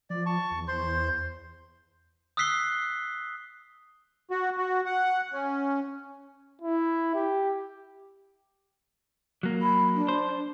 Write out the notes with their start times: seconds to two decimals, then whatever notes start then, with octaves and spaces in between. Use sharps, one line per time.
0.10 F3 D5
0.26 A5 C#6
0.51 E2
0.68 C5 C6
2.37 D#6 E6 F#6 B6 C7 G7
4.31 F#4
4.58 F#4
4.85 F#5
5.33 C#4
6.62 E4
7.15 G4
9.43 F#3 A#3
9.62 B5
9.94 D4
10.08 C5